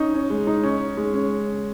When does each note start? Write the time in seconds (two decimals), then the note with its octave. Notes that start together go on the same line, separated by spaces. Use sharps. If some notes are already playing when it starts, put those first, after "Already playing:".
Already playing: C#4 D#4
0.14 C#4
0.30 G#3
0.47 D#4
0.63 C#4
0.97 G#3
1.14 C#4